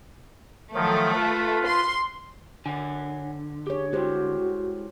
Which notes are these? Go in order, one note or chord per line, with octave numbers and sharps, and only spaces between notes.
D#3 F3 F#3 A3
F4 B4
C6
D3 C#5 F#5 G#5
G4 G#4 C#5
G#3 E4 F#4 G4 C5